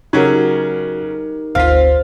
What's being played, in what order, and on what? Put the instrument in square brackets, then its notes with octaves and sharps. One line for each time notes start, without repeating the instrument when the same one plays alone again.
[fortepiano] C#3 F#3 [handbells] D#4 G4 A#4 [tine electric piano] F#4
[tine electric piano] G1 D2 B6 [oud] C4 [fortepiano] F4 F5